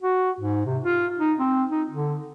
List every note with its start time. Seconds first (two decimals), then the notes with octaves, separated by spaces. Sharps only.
0.03 F#4
0.40 G#2
0.66 C3
0.84 F4
1.19 D#4
1.39 C4
1.72 D#4
1.90 D3